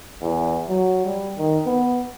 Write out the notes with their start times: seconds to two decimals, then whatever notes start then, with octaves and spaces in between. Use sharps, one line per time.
0.21 E2
0.69 F#3
1.06 G3
1.38 D#3
1.66 B3